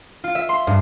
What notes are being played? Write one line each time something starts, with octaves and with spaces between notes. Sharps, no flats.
F4
E5
C6
G2